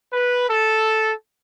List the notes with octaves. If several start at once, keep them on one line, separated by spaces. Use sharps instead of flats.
B4
A4